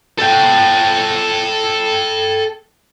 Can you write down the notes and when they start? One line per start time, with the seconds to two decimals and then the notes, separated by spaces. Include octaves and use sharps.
0.19 A4 G5